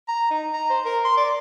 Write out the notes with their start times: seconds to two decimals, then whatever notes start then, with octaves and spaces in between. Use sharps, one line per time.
0.08 A#5
0.31 D#4
0.53 A#5
0.70 C5
0.85 A#4
1.05 C6
1.17 D5